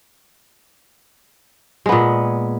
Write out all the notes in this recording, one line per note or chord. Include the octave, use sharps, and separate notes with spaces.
A#2 G#3 B3